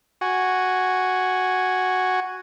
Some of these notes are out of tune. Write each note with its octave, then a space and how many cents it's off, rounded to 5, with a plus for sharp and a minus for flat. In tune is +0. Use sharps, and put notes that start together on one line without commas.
F#4 +0 G#5 +0